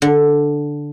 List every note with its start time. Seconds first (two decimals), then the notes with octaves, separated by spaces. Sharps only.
0.02 D3